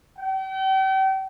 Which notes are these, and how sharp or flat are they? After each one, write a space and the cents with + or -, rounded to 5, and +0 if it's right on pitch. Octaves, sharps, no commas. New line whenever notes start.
G5 -40